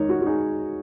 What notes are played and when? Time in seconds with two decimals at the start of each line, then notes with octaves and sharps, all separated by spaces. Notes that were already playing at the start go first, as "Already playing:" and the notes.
Already playing: D#3 G#3 D#4 A#4 C#5
0.09 F#4
0.21 F#4
0.26 D#4 G#4